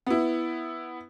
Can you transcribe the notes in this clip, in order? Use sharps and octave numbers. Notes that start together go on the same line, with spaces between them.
B3 E4